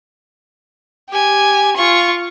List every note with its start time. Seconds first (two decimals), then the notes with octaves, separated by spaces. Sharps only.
1.09 G4 G#5
1.76 F4 C#6